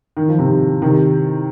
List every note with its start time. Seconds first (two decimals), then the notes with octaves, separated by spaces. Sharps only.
0.17 D#3
0.29 F3
0.39 C3 D#3
0.82 C3 D#3